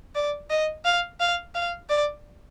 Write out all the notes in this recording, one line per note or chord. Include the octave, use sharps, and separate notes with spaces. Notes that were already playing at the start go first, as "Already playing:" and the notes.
D5
D#5
F5
F5
F5
D5